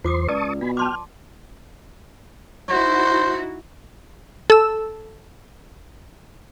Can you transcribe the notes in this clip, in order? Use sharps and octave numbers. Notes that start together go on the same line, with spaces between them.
E2 F4 C5 C6 D6 D#6
C#2 B4 D5 A5 C#6 D#6
B2 G#5 B5
G5 A5 C6 D6 F6
D#4 E4 F#4 C5
A4 E6